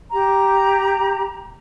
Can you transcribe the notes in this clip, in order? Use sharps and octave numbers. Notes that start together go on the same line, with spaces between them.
G4 A#5